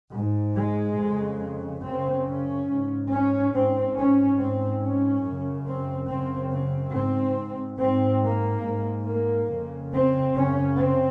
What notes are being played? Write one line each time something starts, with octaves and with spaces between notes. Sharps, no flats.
G#2
G#3
F2 C#3
F#2 C#3 C4
C#4
G#2
C#4
G#2 C4
C#4
G#2 C4
C#4
F#2 C#3
C4
F#2 C#3 C4
C4
G#2 C4
G#2 C4
A#3
G#2
A#3
F2 C#3
C4
F#2 C#3 C#4
C4